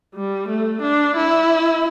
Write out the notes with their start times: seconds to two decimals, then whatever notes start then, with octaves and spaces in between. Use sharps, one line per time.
0.15 G3
0.49 A3
0.82 D4
1.17 E4